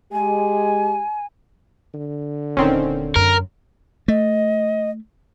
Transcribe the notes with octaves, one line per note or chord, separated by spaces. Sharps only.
G#3 G4 G#5
D3
D#1 D#3 C4 C#4
F#2 A#4
A3 D#5